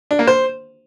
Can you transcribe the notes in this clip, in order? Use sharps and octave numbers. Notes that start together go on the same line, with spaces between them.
D4
A#3
C5